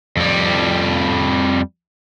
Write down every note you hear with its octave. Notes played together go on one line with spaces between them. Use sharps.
F2 G3